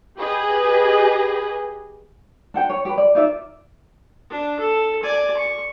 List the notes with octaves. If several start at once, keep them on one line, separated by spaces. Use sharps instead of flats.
G4 G#4 B4 D#5
D4 F#5 G5
C#5
G4 B4
D5
D#4 F4 D5 E5
D4
A4
D5 G#5
C#6